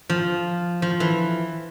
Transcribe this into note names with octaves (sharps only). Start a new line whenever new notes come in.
F3
F3
E3